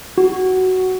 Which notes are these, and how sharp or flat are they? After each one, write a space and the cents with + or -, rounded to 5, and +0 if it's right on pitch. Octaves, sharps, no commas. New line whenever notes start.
F#4 +10